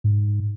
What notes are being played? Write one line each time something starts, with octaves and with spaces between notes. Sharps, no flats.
G#2